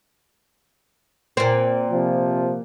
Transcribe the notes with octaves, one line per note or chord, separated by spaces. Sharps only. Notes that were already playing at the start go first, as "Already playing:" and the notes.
A#2 C4
C3 F3